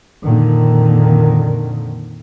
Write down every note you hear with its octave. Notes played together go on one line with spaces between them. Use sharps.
F2 A#2 D3 D#3